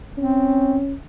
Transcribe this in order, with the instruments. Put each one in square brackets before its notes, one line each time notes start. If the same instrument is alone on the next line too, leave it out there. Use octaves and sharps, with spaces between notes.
[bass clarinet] C4 [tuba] C#4